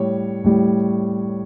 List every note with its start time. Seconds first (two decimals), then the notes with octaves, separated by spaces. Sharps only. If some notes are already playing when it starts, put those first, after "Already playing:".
Already playing: A2 G3 C#5
0.44 A2 G3